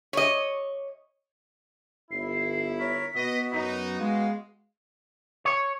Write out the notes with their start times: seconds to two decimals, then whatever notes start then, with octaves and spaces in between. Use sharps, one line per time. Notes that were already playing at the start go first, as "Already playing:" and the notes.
0.13 C#5 D#5
2.11 G1 E4 C7
2.79 A#4 C#5 B6
3.15 B2 B3 F#4 D#5
3.53 F#2 D#4
3.99 G#3 F5
5.45 C#5